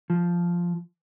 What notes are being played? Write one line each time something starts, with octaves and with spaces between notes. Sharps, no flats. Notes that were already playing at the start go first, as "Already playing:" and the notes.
F3